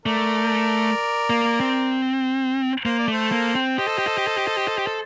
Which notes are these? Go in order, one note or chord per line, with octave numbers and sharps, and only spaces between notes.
A3 A#4 D5
A#3
C4
A#3 C5
D5
A3 A4 C5
A#3
C4
G4 C5 D#5
A4
G4
A4
G4
A4
G4
A4
G4
A4
G4
A4